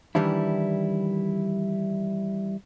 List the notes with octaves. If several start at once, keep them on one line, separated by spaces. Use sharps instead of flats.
D#3 E3 G3 D4 E4